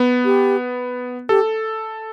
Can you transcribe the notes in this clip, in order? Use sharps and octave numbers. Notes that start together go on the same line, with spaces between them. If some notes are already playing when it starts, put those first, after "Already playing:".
Already playing: B3
G4
G4 A4